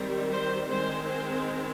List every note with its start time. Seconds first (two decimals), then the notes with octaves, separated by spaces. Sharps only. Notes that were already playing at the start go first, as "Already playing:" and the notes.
Already playing: D#3 G3 C4
0.31 C5
0.69 D#3 G#3 C4 C5
1.07 C5